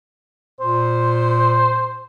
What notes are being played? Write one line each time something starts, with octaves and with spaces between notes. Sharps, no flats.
A#2 C5